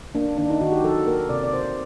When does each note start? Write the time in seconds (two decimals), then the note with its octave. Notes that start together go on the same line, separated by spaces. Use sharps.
0.15 A#3 D4
0.38 D#3 D4
0.50 D#4
0.61 D#3 F#4
0.72 G4
0.84 F#3 A4
1.07 A#3 A#4
1.29 C3 D5
1.44 D5
1.53 C3 C5